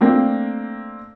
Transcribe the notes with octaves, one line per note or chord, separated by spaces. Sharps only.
A3 A#3 C4 D4